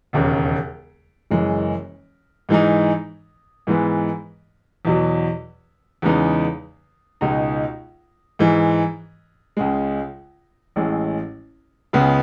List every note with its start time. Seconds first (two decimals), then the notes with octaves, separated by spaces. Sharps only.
0.13 E1 D#2 C#3
1.31 F#1 F#2 E3 G#3
2.49 G#2 E3 G#3 D#4
3.67 G#2 E3 G#3 B3
4.85 E2 B2 F#3
6.02 E2 C#3 G#3 B3 D#4
7.21 C#2 B2 G#3 D#4
8.39 G#2 E3 G#3
9.57 C#2 C#3 G#3
10.76 A1 A2 G#3
11.93 C#2 C#3 G#3 B3